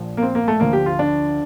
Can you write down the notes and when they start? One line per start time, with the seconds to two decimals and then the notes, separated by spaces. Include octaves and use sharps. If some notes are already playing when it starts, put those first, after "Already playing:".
Already playing: A#1 A#2 F3
0.17 A#3
0.23 C4
0.35 A#3
0.48 A3
0.60 D2 D3 F3 A#3
0.73 G4
0.86 F4
0.99 D4